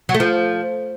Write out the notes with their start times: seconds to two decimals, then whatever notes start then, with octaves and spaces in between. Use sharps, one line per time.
0.09 F#3
0.14 A3
0.20 F3